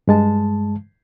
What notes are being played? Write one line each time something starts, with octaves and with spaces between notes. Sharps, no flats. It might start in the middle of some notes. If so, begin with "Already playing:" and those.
G2 G#3 A5